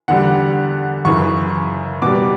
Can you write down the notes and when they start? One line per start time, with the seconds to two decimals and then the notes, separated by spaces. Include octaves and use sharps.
0.08 E2 D3 G3 F#5
1.05 F#2 C#3 E3 C#6
2.02 B2 G3 D6